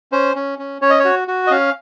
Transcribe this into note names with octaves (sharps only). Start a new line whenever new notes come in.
C#4 C5
C#4
C#4
C#4 C#5
D#5
C#5
F#4
F#4
D#5
C#4 F5